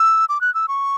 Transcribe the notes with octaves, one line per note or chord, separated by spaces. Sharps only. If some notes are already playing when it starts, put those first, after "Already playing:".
Already playing: E6
D6
F#6
E6
C#6